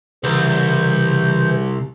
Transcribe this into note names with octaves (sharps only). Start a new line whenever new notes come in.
C2 C#3 E3 G6